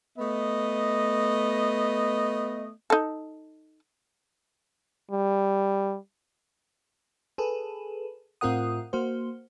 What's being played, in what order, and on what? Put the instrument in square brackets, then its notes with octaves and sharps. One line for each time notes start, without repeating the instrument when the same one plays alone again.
[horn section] A3 B3 D#5
[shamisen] D#4 A4
[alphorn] G3
[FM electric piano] G#4 A4 B4
A2 C4 F4 A#4 F#5 D#6
A#3 F#4 C5